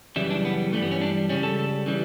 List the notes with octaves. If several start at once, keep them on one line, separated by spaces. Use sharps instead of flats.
F#2 C#3 E3 G3 E4
D4
B3
G2 E3 G3 A3
B3
C#4
D4
C#2 C#3 G3 C#4
A4
C#3 E3 G3